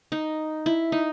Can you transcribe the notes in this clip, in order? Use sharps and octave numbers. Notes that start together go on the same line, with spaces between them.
D#4
E4
D#4